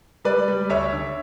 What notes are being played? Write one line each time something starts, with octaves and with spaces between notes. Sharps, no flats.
G3 B4 D5
G3
D2 C#5 E5
D3